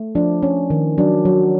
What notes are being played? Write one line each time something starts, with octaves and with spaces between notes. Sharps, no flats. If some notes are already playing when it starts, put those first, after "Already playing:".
Already playing: A3
F3 D4
C#4
D#3
F#3 D4
F#3